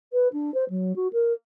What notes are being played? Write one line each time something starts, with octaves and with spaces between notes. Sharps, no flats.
B4
D4
C5
F#3
F#4
A#4